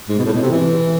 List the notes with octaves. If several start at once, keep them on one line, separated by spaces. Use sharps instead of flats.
G#2
B2
A2
B2
C3
E3